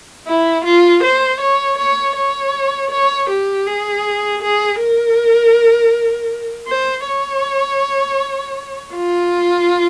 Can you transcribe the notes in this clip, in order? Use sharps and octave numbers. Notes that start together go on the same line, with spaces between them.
E4
F4
C5
C#5
C#5
C#5
C#5
G4
G#4
G#4
A#4
C5
C#5
F4